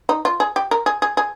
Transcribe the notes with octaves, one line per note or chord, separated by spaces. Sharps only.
D#4
F4
G#4
G4
A#4
G#4
G#4
G#4